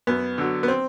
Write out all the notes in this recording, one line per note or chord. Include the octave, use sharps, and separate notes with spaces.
F#2 B3
D3 F#3
B3
C4